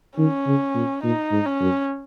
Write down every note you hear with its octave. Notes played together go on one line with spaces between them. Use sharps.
D#3 C#4
C#3
A#2
A#2 D#4
G#2
C#4
F#2